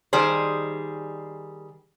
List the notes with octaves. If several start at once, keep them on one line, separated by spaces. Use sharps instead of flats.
D#3 G3 G#4 C5